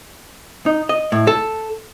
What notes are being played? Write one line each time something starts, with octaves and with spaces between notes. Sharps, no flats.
D#4
D#5
A2
A4